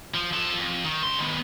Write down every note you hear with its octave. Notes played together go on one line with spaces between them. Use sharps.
F3
F3 A4
F2
D#3
C#2 C6
D#3 B3